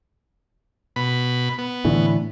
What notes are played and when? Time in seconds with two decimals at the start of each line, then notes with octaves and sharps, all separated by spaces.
0.96 B2 B5
1.58 B3
1.85 A2 D3 E3